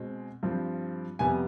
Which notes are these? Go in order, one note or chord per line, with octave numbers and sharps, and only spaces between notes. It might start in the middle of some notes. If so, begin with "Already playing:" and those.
Already playing: B2 G#3 C4
G2 F3 C4
F2 C3 G3 B3 G#5